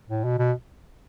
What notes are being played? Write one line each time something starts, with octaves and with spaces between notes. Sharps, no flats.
A2
B2
B2